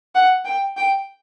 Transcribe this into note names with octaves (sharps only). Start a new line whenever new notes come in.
F#5
G5
G5